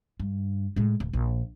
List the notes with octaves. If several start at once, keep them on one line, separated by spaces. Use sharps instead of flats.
G2
A2 G#3
D1
A#1